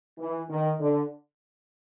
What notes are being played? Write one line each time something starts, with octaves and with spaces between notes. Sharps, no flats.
E3
D#3
D3